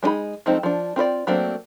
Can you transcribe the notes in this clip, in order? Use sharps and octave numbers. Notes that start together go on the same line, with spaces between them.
G#3 D4 D#4 G#4 B5
F3 G#3 A3 C4 D#4
F3 D4
C4 F4 C5 D5
F#3 A3 A#3 C4 D4